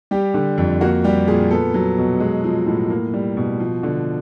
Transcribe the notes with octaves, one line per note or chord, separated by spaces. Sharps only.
G3 G4
D3
F2
A#3 F#4
G3 G4
A#2 G#4
B3 A4
F#3
B2
G#3
F3
A2
A#3
G3
B2
F3
D3